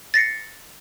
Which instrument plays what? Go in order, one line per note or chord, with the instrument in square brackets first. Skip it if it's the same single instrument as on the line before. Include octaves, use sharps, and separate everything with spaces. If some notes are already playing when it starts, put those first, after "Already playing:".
[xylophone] A6 A#6 C7 C#7